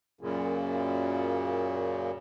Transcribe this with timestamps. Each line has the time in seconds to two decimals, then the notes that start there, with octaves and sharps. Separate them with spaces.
0.21 F#2 A#2 C#3